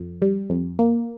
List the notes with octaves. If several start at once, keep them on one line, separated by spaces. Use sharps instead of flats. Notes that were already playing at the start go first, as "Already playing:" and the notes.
Already playing: F2
G3
F2
A#3